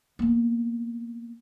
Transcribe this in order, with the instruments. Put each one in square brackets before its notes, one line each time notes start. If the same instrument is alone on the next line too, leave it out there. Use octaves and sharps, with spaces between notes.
[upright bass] A#3 B3